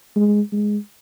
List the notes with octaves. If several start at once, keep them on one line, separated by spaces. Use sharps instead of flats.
G#3
G#3